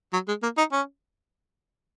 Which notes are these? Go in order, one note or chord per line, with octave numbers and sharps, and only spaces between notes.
F#3
G#3
A#3
D#4
C#4